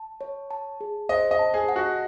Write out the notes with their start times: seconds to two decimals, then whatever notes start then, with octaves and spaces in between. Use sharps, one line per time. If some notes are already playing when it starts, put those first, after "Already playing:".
Already playing: A5
0.21 C#5
0.50 A5
0.81 G#4
1.09 C5 D#5
1.31 D#5
1.39 A5
1.54 G#4
1.69 F#5
1.76 F#4